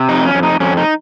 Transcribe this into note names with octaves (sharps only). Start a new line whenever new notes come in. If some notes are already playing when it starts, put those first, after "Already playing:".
Already playing: C3
F2 D#4
C#4
F2
D#4
F2 C#4
D#4